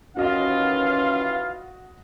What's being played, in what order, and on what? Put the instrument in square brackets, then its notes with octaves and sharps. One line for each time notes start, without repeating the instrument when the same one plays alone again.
[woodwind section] D#2 E3 F4 [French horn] C#4 [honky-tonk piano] F#4 D#5 [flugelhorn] F5